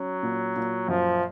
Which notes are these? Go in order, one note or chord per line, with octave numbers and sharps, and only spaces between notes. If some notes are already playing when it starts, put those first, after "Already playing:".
Already playing: F#3 C#4
A#2
A#2
F#2 F3